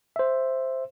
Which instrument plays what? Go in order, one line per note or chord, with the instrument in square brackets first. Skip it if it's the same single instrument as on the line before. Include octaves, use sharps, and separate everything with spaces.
[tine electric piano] C5 E5